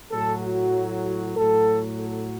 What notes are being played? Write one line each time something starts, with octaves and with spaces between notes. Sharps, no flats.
A2 F#3 A4
F#4
F#4
A2 F#3 A4
A4